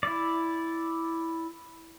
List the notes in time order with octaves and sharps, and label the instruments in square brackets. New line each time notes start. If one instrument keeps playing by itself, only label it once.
[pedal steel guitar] E4 D5